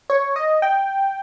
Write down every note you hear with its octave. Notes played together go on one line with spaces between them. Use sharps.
C#5
D#5
G5